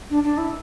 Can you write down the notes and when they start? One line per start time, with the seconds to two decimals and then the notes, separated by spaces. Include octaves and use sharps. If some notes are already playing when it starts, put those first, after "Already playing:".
0.10 D4
0.24 D4
0.38 E4